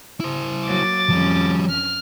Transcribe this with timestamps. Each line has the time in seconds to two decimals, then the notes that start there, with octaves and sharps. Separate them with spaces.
0.20 E4 C5
0.67 F#3 A#3 D6 A6
1.10 F2 F3 G3 C#4
1.69 F6